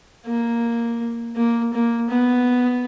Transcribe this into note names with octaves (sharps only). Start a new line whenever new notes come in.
A#3
A#3
A#3
B3